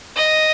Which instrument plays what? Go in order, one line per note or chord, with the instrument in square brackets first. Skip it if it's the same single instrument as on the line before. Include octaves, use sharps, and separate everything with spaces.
[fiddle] D#5